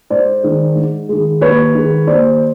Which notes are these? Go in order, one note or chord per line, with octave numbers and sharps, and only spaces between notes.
G#2 C5 D5
D#3 G#3
G#2
D#3 G#3
D#2 B4 C#5
D#3 G#3
D#2 C5 D5